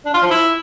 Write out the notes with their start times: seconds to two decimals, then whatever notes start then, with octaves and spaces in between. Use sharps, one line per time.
0.05 D4
0.14 F4
0.22 F3
0.31 E4